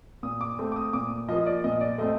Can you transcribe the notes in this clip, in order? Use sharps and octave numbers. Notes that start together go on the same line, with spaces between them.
A#2 D#6
D6
A3 C4
D6
D#6
A#2 D6
F3 A#3 D#5
D5
A#2 D#5
D5
A3 C4 D#5